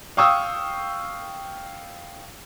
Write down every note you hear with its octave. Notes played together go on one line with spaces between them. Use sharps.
F5 G5 C#6 D#6 E6